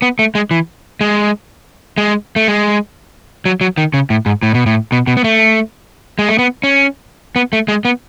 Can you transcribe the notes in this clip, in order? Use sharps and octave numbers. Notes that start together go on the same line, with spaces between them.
B3
A3
G#3
E3
G#3
G#3
A3
G#3
F#3
F#3
D#3
C#3
A2
G#2
A2
B2
A2
B2
B2
B3
A3
G#3
A3
B3
C#4
B3
A3
G#3
B3